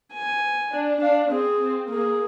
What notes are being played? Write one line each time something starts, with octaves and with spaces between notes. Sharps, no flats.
G#5
D4
D4 F5
C4 G#4
C4
A#3 G#4